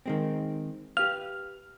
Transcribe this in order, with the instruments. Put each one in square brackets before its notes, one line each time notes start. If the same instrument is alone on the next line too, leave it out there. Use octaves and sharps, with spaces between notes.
[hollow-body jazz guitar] D#3 G#3 C4
[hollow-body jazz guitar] G4 B4 F5 [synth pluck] F6